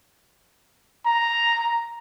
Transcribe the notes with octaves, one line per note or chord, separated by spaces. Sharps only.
A#5